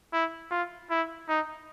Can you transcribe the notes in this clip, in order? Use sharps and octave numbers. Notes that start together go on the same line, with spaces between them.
E4
F4
E4
D#4